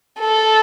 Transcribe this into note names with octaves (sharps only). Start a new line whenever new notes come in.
A4